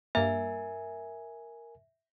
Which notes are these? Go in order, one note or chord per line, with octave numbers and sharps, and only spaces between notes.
G2 A#3 A#4 E5 G#5